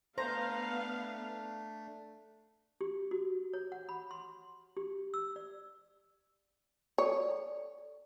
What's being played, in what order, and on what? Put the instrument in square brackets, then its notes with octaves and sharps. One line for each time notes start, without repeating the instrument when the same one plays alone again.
[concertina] A3 D4 [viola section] B3 F5 [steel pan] C5 [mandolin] A#5
[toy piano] G4
F#4
C#5
F#5
B5
C6
G4
E6
D5
[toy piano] A4 D5 [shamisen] C#5